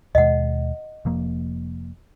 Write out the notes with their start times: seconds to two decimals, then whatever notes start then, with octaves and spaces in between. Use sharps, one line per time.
0.15 D#2 B2 G#3 D#5 F#5
1.05 F1 F3 A#3